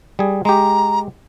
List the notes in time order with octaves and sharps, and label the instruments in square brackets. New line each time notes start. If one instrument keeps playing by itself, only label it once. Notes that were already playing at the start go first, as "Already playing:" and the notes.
[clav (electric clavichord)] G3 G#4
[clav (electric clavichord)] G#3 G4 [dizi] A#5